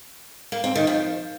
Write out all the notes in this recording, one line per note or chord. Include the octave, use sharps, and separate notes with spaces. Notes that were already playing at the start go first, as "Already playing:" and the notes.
A#3
C4
D#3
F3